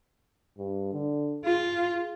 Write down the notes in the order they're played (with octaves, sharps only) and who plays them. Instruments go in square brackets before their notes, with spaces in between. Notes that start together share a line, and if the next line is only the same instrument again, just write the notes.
[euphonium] G2
D3
[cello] F4 [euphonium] G#4